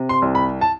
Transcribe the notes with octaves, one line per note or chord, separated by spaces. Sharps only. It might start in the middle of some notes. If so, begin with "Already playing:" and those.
Already playing: C3
C6
C2
B5
A5